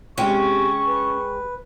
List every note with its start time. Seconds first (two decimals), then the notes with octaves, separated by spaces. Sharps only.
0.18 C3 G#3 C#4 G5 C#6
0.87 B4